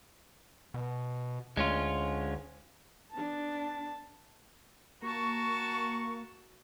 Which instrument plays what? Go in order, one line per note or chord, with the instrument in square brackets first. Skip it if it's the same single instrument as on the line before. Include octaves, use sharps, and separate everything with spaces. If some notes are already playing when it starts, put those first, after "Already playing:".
[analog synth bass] B2
[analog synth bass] D2 [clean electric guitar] G#3 C#4 F4
[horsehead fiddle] B3 D4 [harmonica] A5
[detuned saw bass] A#3 [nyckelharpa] F#4 A5 [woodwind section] A#5 C#6